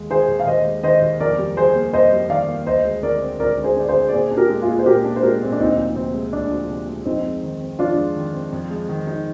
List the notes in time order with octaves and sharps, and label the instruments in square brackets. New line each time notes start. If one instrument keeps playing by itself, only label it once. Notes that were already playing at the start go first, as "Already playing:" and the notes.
Already playing: [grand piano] D#2 G#3
[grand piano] D#3 [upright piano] G#4 C5
[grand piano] D#2
[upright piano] F5
[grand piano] D#2 [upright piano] C5 D#5
[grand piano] G#3
[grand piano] D#3 [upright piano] C5 D#5
[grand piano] D#2
[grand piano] F2 [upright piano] A#4 D5
[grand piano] G3
[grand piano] D#3 [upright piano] G#4 C5
[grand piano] A#3
[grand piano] F2 [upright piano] C5 D#5
[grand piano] G3
[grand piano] D#3 [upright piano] D5 F5
[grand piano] A#3
[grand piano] D2 [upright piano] C5 D#5
[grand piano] G#3
[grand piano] D3 [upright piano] A#4 D5
[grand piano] C4
[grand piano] D2 [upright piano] A#4 D5
[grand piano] G#3
[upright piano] G#4 C5
[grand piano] D3 [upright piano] D5
[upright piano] G#4 C5
[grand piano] C4
[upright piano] D5
[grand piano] A#2 [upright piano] G#4 C5
[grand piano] D4
[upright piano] G4 A#4
[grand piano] G#3
[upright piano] F4 G#4
[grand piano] A#2
[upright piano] C5
[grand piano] A#2 [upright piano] G4 A#4
[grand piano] D4
[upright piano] C5
[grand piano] G#3 [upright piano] G4 A#4
[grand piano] A#2 [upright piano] C4
[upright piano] D4
[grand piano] D2 [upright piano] C4 D#4
[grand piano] F3
[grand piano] C3 [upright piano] C4
[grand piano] G#3
[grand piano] D2 [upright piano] D4
[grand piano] F3
C3
G#3
[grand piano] F2 [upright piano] C4 D#4
[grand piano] G#3
D#3
C4
[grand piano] F2 [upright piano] D4 F4
[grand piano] G#3
D#3
C4
F2
G#3
D#3
D#4